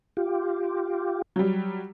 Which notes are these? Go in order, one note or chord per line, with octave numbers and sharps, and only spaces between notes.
F4 G4
F#3 G3